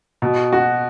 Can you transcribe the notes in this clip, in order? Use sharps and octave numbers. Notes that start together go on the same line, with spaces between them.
B2
F#4